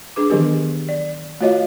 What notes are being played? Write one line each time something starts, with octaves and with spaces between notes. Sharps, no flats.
D4 G#4 B4 D6
D#3 E3 F#3 B3 G4 A#4
D5
A3 F4 F#4 C#5 D#5 F5